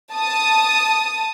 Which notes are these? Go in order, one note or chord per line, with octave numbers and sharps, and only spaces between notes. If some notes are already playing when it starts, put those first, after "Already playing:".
A5 D#6